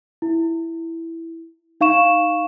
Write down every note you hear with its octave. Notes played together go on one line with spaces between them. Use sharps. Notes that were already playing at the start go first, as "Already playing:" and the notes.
E4
D#4 F5 C#6 E7